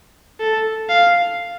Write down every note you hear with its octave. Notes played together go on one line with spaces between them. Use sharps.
A4
F5